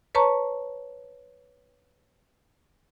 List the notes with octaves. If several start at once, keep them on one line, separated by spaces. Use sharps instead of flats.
B4 C#5 A5 A#5 C#6